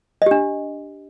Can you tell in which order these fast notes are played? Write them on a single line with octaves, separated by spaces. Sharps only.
D#5 G4 D4